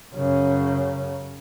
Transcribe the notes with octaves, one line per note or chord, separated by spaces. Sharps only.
F#2 C#3